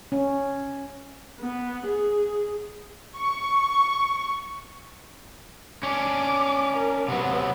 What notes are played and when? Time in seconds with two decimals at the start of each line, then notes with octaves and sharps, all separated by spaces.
0.12 C#4
1.40 B3
1.87 G#4
3.18 C#6
5.83 C#4 D4 D6
6.77 A#4
7.08 C3 F#3 B3